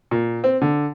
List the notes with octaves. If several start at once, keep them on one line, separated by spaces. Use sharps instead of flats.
A#2
C4
D3